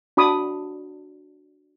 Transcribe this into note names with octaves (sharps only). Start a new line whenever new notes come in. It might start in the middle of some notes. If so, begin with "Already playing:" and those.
D4 F#4 B5 D6 D#6